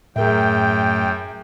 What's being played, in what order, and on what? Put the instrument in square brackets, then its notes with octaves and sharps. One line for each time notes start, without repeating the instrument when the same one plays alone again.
[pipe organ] F#2 [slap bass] A2 A3 [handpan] G#4 A#4 E5 [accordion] G5